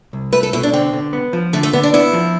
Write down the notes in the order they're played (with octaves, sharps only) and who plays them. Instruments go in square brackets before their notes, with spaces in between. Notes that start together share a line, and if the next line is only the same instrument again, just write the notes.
[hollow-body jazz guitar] C2
[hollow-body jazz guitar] A3 [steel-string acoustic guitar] B4
[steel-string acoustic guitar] A4
[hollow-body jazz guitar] B2 [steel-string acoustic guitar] E4
[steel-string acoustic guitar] D4
[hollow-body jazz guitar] D3 [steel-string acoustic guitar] C4
[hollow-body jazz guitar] D3
B3
F3
[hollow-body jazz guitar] D3 [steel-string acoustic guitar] A3
[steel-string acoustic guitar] A3
[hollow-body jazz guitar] D3 [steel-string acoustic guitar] B3
[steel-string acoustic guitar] D4
[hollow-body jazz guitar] B3 [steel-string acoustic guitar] E4
[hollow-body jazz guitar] F3